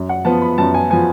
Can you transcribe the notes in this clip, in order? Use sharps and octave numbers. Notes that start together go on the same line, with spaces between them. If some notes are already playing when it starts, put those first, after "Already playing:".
Already playing: F#2
F#5
F3 B3 A5
B5
F#2 A5
G#5
F3 B3 G#5